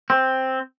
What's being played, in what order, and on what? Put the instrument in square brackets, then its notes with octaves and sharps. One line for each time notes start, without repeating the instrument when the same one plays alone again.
[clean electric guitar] C4